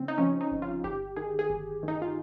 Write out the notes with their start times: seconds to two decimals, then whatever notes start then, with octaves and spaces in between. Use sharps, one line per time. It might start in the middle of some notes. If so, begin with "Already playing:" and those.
Already playing: C#3 C4
0.08 D#4
0.18 F3 C#4
0.41 D#4
0.51 G1
0.62 F4
0.84 G1 G4
1.16 D#3 G#4
1.39 G#4
1.50 G1
1.83 D#3
1.88 D#4
2.02 F4